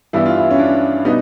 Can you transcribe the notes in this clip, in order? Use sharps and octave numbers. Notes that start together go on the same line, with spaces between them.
G2 E3 G3 B3 E4
F4
E4
C#4
D4
B2 G3 B3 D#4